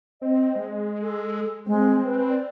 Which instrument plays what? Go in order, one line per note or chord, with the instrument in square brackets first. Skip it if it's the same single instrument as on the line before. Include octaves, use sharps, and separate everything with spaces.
[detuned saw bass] C4 [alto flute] D#5
[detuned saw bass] G#3
[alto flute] A4
[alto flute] G#3 [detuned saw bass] C4
[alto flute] B4
D5